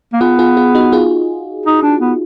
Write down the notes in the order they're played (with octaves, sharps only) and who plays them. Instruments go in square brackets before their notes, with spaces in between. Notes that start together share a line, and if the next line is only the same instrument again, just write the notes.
[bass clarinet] A#3
[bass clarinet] B3 [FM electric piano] F4 G#4
[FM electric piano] F4 G#4
F4 G#4
D#4 F#4
F4 G#4
[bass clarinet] D#4
D4
B3